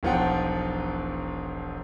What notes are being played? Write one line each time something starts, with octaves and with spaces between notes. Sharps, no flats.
E1 B1 F3 F4 F#5 G5